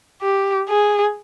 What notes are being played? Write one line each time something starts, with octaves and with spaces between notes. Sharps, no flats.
G4
G#4